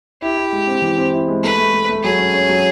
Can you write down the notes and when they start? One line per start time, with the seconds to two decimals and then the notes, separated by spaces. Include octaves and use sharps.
0.22 E4 G4
0.37 E4
0.52 G#3
0.67 C4
0.82 E3
0.97 C4
1.13 E4
1.28 G#3
1.43 A3 B4
1.58 A3
1.73 A3
1.89 A3
2.04 F#3 G#4
2.19 C#4
2.34 C#4
2.49 F#3